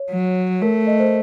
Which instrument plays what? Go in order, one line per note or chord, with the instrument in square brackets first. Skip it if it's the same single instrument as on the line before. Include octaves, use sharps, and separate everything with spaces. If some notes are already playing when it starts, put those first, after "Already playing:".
Already playing: [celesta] C#5
[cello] F#3
[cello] A3 [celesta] A#4
[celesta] D#5
C5